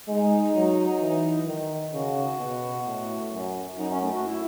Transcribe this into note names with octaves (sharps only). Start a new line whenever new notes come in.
G#3 D#4
F#3
E3
D#3
C#3 F#4
B2
A2
F#2
F#2 D#4
C#4
A3
F#4
E4